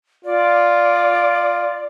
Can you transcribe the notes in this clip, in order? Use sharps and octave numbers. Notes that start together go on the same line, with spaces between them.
F4 D5